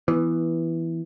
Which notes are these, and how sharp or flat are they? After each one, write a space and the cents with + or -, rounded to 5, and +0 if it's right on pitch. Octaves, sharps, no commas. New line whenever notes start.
E3 +0 B3 +0